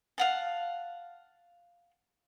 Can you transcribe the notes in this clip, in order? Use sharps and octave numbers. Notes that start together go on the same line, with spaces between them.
F5 F#5 A5